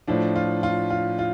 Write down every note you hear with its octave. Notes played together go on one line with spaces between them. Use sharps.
A2 F3 D4
F4
F4
F4
F4